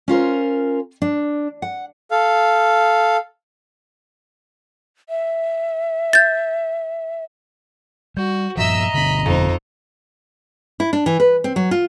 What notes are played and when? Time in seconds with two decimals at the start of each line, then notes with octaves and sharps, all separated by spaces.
0.08 C#4 F4 A#4 C5
1.02 D4
1.62 F#5
2.11 A4 F5
5.09 E5
6.13 G6 A6
8.17 G3 F#4 G6
8.57 G2 A#2 F3 D#5 E5 A#5 E6
8.94 G1 B2 D3 B5
9.26 F2 D#4 C5
10.80 E4
10.93 D4
11.06 E3
11.20 B4
11.44 C4
11.56 F#3
11.71 F4